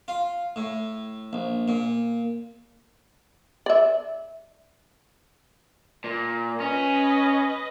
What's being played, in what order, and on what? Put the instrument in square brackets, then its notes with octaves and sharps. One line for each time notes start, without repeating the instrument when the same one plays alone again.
[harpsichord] F4
A2
A#1
A#2
[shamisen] D5 E5
[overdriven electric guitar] A#2
[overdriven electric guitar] C#4 [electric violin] B4 D#5